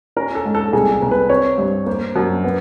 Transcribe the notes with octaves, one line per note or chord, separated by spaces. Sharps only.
C#4 A#4
A4
G#2
A4
C2 G#4
A4
C2
B4
C4 C#5
G2
A#3 C5
F#2
B3